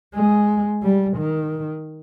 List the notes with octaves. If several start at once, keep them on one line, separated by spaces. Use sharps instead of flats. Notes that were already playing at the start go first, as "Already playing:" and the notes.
G#3
G3
D#3